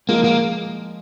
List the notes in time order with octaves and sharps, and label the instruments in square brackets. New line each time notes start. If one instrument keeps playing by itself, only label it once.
[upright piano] F3 G#3 [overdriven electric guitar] A#3
[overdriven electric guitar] A#3